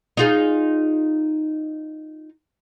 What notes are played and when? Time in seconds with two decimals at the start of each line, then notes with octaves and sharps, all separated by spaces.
0.17 D#4 F4 G#4